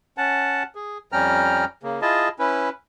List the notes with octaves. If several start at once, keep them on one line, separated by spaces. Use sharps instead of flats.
C#4 F#5 A5
G#4
F2 G3 C#4 G5 A#5 F6
C#3 A#3
E4 F4 G#4 D#5 A5
C#4 E4 B4